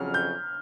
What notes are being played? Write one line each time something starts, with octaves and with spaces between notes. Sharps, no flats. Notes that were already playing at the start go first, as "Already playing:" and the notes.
Already playing: F2 C#3 F#3 F6
G6